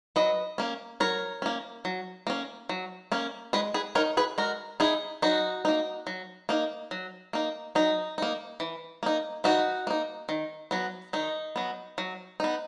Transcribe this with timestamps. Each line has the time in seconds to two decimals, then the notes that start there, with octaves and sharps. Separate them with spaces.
0.16 F#3 B4 D#5
0.58 A#3 C#4
1.00 F#3 A#4 C#5
1.42 A#3 C#4
1.85 F#3
2.27 A#3 C#4
2.69 F#3
3.12 A#3 C#4
3.53 G#3 G#4 B4
3.74 G#4 B4
3.95 D#4 A#4 C#5
4.17 G#4 B4
4.38 G#3 F#4 A#4
4.80 D#4 E4 G#4
5.22 F#3 D#4 F#4
5.65 A#3 D#4
6.07 F#3
6.49 A#3 D#4
6.91 F#3
7.33 A#3 D#4
7.75 F#3 D#4
8.18 A#3 D#4
8.60 E3
9.03 A#3 D#4
9.44 E3 D#4 F#4
9.87 A#3 D#4
10.29 D#3
10.71 F#3 B3
11.13 D#3 D#4
11.56 F#3 B3
11.98 F#3
12.40 B3 D#4